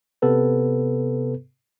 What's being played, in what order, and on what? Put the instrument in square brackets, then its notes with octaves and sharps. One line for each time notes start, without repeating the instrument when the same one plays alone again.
[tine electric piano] C3 B3 A4 B4